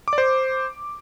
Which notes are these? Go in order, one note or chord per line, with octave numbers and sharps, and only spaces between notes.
D6
D5
C5